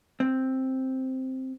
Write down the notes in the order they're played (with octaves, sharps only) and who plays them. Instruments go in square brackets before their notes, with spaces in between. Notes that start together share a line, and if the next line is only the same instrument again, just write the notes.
[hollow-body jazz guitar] C4